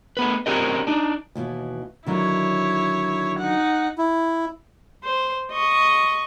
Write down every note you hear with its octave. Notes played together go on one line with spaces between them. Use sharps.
A3 B3 B4
C4 C#4 G4 A#4 D#5
D4 D#4
D#2 B2 E3
D3 D#3 F#3 E4 C#5
D#4 F#5
E4
C5
D#5 C#6